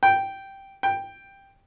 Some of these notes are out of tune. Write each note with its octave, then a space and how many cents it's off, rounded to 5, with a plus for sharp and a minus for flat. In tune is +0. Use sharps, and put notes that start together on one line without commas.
G5 -5
G5 +5